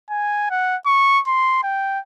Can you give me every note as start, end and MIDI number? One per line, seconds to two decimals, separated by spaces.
0.10 0.47 80
0.50 0.76 78
0.86 1.20 85
1.27 1.59 84
1.63 1.99 79